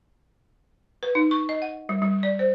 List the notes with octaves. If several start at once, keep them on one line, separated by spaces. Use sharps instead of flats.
B4
D#4
C#6
D#5
F#5
G3
G3
D5
C5